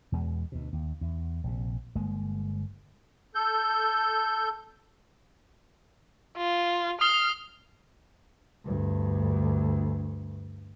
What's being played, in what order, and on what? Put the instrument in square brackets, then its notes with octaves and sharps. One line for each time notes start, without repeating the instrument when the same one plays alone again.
[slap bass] E2 B2 G#3
D2 B2
D#2
E2
A#1 C3
G1 G#3 A#3
[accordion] A4 G6
[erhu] F4
[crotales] D#6 C7 G7 [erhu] F6
[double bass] D2 G2